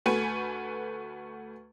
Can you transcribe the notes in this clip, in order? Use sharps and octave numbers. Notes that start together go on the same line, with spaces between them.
D2 A3 F#4 B4 G#5